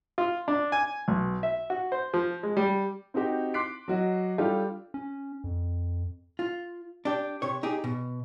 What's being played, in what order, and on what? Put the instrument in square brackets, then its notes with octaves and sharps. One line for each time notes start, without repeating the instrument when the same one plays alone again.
[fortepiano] F4
D4
G#5
B1
E5
F#4
C5
F3
G#3
G3
[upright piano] C4 D#4 F#4 G4
C6 D6 F#6 B6 C7 D7
F#3 F#4 D#5
G3 D4 F4 G4 A4
[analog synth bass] C#4
F2
[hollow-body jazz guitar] F4
D4 G4
C3 C#5
D#4 G4 G#4
B2